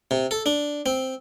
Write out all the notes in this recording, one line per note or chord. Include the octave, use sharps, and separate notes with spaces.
C3
A4
D4
C4